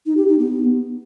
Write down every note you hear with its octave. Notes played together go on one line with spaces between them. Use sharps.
D#4
G4
D#4
B3